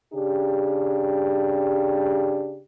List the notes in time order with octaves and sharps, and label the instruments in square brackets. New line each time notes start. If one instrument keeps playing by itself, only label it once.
[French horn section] C#3 D4 G4